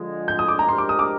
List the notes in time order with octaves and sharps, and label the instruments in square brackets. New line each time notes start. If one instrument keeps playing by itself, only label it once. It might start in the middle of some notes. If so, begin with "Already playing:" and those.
Already playing: [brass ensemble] D3 F3 G#3
[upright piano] G6
D#6
D6
A#5
[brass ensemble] F3 G#3 D4 G4 A#4 [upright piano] C6
[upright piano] D6
D#6
D6